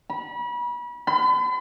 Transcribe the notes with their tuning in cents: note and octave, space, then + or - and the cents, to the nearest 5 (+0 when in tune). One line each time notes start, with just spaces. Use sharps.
B5 -35
B5 +40